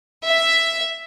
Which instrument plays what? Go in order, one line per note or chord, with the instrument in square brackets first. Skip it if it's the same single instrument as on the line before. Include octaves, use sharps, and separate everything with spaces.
[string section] E5